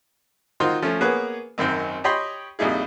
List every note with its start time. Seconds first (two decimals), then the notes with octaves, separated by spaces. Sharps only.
0.60 D#3 D#4 F4 F#4 C5 C6
0.82 F3 A3 C#4
1.01 A#3 B3 G#4 B4 C#5
1.58 G#1 F#2 D#3 C4 C5
2.04 G4 C#5 D#5 G5 B5 C6
2.59 A#1 F2 G3 D#4 E4 G#4